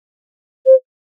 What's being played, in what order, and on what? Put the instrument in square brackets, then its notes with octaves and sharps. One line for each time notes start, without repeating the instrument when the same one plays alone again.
[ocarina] C5